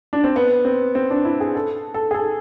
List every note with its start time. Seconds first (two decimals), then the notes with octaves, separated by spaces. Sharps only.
0.13 D4
0.24 C4
0.36 B3
0.65 C4
0.95 C4
1.10 D4
1.25 E4
1.40 G#4
1.55 A4
1.94 A4
2.11 G#4
2.14 A4